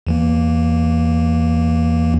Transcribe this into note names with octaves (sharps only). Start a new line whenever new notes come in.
E2 E3 A#3